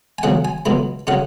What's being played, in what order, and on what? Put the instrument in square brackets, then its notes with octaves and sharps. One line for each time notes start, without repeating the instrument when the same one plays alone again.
[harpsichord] G#5
E2 C#3 F#3 F#5
G#5
C#2 B2 F#3 B5
C#3 F#3 C#4 F#5